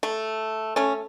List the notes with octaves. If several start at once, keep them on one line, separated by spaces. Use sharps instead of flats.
A3
A3 C#4